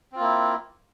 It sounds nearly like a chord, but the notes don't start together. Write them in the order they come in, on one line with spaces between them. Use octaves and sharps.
C4 F4 A#3 E4